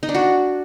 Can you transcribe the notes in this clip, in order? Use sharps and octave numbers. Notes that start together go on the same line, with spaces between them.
D#4
D4
F#4